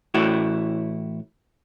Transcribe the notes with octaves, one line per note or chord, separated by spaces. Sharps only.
A2 E3 E4 F#4